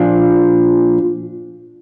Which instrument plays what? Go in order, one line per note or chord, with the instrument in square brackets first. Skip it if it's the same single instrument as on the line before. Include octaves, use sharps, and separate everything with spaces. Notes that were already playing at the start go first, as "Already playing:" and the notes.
Already playing: [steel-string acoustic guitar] A#2 F3 D4